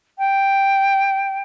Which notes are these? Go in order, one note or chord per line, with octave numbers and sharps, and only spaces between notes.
G5